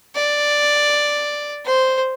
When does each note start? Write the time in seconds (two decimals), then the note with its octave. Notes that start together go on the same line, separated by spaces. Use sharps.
0.15 D5
1.65 C5